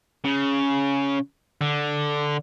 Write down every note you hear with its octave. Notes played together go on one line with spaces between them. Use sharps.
C#3
D3